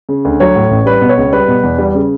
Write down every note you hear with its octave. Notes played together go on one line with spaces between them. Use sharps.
C#3
D2
F#3 C#5
A2
A1
G3 B4
B2
C#5
C#2
G3 B4
B2
E2
G3
C#3